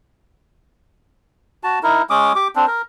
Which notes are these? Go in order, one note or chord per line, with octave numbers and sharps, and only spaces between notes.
F#4 A5
D#4 E4 A#4
G#3 C#4 D6 D#6
G4 D6
C4 D4
A#4